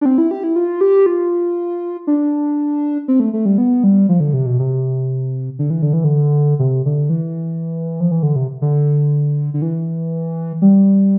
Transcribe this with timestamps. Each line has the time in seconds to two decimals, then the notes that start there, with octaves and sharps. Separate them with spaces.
0.01 D4
0.05 C4
0.18 E4
0.31 G4
0.43 E4
0.56 F4
0.81 G4
1.06 F4
2.07 D4
3.08 C4
3.20 A3
3.33 A3
3.45 G3
3.58 B3
3.84 G3
4.09 F3
4.20 D3
4.33 C3
4.46 B2
4.59 C3
5.59 D3
5.70 E3
5.82 D3
5.93 E3
6.04 D3
6.59 C3
6.86 D3
7.10 E3
8.00 F3
8.11 E3
8.23 D3
8.36 C3
8.62 D3
9.54 D3
9.62 E3
10.62 G3